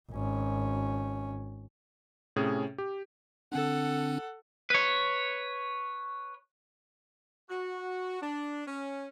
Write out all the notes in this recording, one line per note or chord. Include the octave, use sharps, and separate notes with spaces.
G#1 C#4
A2 C3 C#4 G#4
G4
D3 C4 D4 A4 F#5
B4 C#5
F#4
D4
C#4